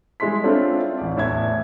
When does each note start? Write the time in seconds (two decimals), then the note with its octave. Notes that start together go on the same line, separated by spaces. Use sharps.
0.20 G3 G#3 E4 C6 B6
0.44 C4 D4 E4 F4 A4 C#5
0.98 A1 D5
1.17 E2 A2 E5 A5 G#6